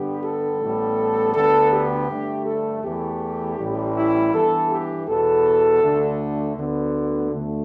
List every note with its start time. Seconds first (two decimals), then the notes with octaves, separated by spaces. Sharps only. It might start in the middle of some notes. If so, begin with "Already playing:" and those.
Already playing: G2 D3 G3 B3 G4
0.23 A4
0.60 A1 A2 G3 B3
1.34 D2 D3 B3 A4
1.72 G4
2.10 G2 D3 A3
2.46 A4
2.83 E2 E3 A3 G4
3.58 A1 A2 E3 G3
3.95 E4
4.32 G2 E3 B3 A4
4.70 G4
5.07 E2 B2 B3 A4
5.82 D2 D3 A3
6.56 D2 D3 B3
7.31 D2 D3 A3